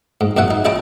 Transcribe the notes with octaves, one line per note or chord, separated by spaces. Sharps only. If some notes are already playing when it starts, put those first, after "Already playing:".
G#2
F#2 B2 E5 F#5 G#5
D#4
C#4 E4 G#4 D#5 G5 A5